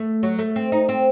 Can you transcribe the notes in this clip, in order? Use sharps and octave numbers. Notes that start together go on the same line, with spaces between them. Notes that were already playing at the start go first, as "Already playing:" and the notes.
Already playing: A3
F#3
A3
C4
D#4
C4